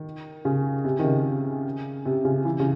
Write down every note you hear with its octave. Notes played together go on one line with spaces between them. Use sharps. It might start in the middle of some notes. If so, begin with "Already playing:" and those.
Already playing: D#3
C#3
C3
D#3
C#3
C3
C#3
E3
C#3